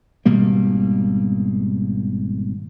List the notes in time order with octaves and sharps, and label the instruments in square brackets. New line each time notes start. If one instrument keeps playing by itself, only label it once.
[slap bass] G#1 B2 G3 A#3